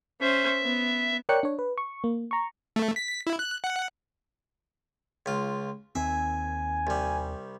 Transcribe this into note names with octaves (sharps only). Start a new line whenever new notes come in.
C#4 C5 E5
B3
A#4 C#5 D5 G5 F#6 C#7
D4 C#5
B4
C#6
A#3
A#5 C#6
A3
B6
E4
F#6
F#5
C#2 F4
D#2 D#3 C4 E5 G#5
C2 G3